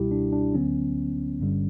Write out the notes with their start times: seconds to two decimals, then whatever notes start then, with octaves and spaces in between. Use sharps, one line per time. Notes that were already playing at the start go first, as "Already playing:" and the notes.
Already playing: C#2 B2 G3 E4 G4
0.11 D4
0.32 D4
0.54 D2 D3 F#3 B3 C#4
1.40 G1 G2 D3 G3